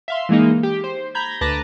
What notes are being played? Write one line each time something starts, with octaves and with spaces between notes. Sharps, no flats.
E5 F5 C6
E3 G#3 A#3 D#4
G4
C5
A#5 B5 G6 G#6
D2 B4 A5 A#5 D6 A#6